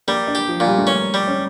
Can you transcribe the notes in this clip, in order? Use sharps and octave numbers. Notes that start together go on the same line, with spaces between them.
G3 A#3
D4
G4
F3
A#2
G3
A3
A#3 C#4
G3
C#4